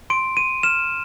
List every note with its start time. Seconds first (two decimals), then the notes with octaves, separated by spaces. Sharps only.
0.10 C6 D7
0.37 C6 D#7
0.63 F6 E7